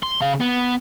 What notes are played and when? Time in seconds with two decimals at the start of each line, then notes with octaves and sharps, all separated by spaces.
0.03 C6
0.22 C#3 F5
0.41 B3